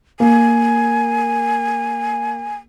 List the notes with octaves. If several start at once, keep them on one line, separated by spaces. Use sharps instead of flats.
A#3 G#5